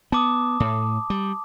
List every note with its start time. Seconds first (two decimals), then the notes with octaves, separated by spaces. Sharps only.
0.12 B3 A5 D6 D#6
0.60 A2
1.10 G3